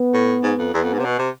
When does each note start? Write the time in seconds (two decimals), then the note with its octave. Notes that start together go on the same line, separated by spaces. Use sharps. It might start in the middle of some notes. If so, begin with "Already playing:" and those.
Already playing: B3
0.14 A2
0.43 G#2
0.58 F2
0.74 E2 B3
0.84 F2
0.93 G#2
0.99 C3
1.04 B2
1.19 C3